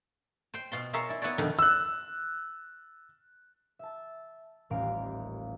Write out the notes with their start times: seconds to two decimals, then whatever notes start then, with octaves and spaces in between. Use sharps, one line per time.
0.54 C5 G5
0.72 B2 F4 C6
0.93 F4 G#4 A#4 C#5 E5 F5
1.09 E4 D5
1.22 B3 E4 B4 C#5 D5
1.38 F2 B2 D3 D#3
1.59 E6 F#6
3.79 E5 A5
4.70 D#1 A1 A#4 F5 D7